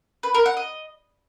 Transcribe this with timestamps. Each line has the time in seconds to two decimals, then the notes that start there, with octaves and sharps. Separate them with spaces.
0.23 B4
0.34 A#4
0.46 F#5
0.57 D#5